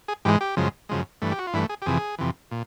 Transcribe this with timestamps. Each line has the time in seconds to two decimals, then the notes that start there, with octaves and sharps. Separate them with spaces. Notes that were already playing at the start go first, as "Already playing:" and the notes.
0.08 G#4
0.25 G#2 E3 G#3 G4
0.41 G4
0.57 F#2 C#3 F3 G#3
0.89 F#2 C#3 F3 G#3
1.22 G2 E3 A3
1.32 G4
1.39 F#4
1.47 F4
1.53 G2 E3 A3 E4
1.69 G#4
1.82 G4
1.86 F2 C3 E3 G#4
2.18 F2 C3 E3
2.51 A#2